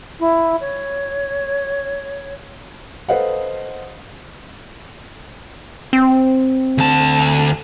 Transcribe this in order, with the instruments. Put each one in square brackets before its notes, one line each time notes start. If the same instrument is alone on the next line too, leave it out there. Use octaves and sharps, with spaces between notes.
[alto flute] E4
C#5
[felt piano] A4 B4 C5 D#5 F5 F#5
[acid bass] C4
[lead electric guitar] D2 A5